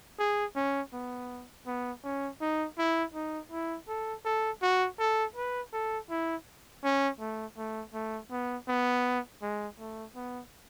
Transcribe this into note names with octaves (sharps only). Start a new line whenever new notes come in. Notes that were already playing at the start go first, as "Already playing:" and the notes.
G#4
C#4
B3
B3
C#4
D#4
E4
D#4
E4
A4
A4
F#4
A4
B4
A4
E4
C#4
A3
A3
A3
B3
B3
G#3
A3
B3